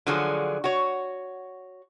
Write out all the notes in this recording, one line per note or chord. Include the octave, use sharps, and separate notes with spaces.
D3 F3 F#3 F#4 G#4
F#4 C#5